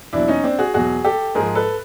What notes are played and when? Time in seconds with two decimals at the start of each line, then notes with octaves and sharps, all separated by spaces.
0.13 E2 B2 F#3 D4 E4
0.28 C#4 D#4
0.44 C4 D4
0.59 F#4 G#4
0.74 E2 B2 F#3 F#4 G#4
1.05 G4 A4
1.35 G#2 F3 G#4 A#4
1.55 A4 B4